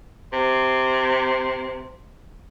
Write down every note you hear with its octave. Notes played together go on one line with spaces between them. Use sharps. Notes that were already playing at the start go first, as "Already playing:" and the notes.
C3 C6